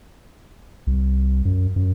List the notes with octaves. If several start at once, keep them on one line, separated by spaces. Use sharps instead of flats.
C2
F#2
F#2